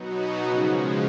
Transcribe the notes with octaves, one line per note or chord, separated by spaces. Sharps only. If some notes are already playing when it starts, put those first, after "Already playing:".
Already playing: B2 F#3 B3 D#4 F#4
C#3 F3 G#3 C#4